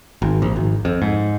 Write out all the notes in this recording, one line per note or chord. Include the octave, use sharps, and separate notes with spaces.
G#1
A#1
G#1
F2
G#2